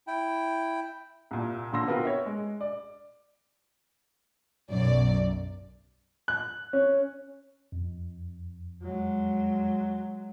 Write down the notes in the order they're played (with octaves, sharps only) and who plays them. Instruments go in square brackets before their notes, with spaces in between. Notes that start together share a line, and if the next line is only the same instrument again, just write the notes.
[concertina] E4 G5
[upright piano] C2 A#2
A1 A#2 D3 C6 E6 A#6
B3 C4 F4 F#4 A#4 B4
C#5 E5
G#3
D5
[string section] B1 F#2 D5
[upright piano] F#6
C#4
[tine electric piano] F2
[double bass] F#3 G#3